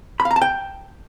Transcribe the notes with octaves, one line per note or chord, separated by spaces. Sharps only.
B5
F5
A#5
A5
G5